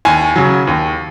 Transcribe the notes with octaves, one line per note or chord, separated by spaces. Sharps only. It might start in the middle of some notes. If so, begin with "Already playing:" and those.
D#2 G#5
C#3 F#3
D#2